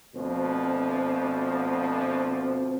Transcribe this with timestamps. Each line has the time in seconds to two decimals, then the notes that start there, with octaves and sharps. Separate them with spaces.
0.16 D2 B2 F3 C4